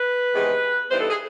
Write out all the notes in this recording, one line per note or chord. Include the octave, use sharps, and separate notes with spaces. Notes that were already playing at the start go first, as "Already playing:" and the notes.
Already playing: B4
E2 C3 D#3 G#3
G2 E3 G3 B3 D#4 C5
A4
G#4